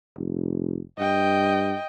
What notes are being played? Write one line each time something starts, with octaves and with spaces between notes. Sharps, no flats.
F1
G2 D#5 G5